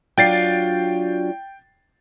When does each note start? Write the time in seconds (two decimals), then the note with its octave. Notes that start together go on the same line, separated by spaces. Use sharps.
0.18 F#3 D4 F4 G5 A6 C7